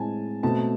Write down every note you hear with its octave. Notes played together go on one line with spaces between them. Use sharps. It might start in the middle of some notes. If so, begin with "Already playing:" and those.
Already playing: A2 G#3 C4 G#5 A5
B2 A3 C4 A5